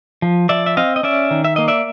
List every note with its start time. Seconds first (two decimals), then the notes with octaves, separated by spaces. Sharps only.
0.22 F3
0.49 F3 D5 E5
0.66 E5
0.77 C4 D#5 F5
0.96 D#5
1.03 C#4 D5 E5
1.31 D#3
1.44 E5
1.56 A#3 D#5
1.68 D5 E5